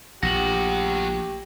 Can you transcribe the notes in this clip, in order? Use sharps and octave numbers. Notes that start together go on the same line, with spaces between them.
A#1 A3 G4 F#5 A#6 F#7